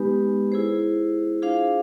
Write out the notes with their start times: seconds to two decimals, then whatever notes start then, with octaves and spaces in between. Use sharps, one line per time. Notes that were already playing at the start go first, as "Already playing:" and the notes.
Already playing: G#3 B3 D#4 G4 B4
0.52 E4 G#4 C5
1.42 D4 F4 G#4 C5 F5